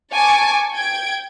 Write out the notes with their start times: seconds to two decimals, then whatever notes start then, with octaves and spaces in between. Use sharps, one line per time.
0.13 G#5 A5 C#6 D6
0.74 G5 G#6 D7